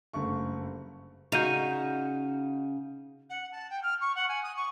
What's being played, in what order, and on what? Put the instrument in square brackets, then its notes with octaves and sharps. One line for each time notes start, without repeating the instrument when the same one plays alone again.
[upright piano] F#1 G2 A3 C#6
[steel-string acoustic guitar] C#3 [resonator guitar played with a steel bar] D#4 F#4 [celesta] G6 D#7 F7
[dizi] F#5
A5
G5
F6
C#6
F#5
G#5
D#6
C#6